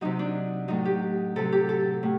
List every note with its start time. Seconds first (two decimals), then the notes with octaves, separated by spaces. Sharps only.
0.01 C3 F#3 D#4
0.19 D4
0.68 A2 F#3 D#4
0.85 G4
1.36 C3 F#3 A4
1.52 G4
1.69 A4
2.03 A2